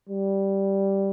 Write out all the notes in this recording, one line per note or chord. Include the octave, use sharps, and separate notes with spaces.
G3